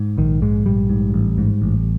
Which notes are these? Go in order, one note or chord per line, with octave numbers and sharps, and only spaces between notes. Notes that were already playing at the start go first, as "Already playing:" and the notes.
Already playing: G#2
A#1 D#3
G#2 G#3
A#1 G3
G#2
A1
G#2
A1